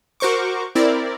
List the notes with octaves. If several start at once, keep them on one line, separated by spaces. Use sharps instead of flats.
F#4 A#4 C5 C#6 D6
C4 E4 A#4 D5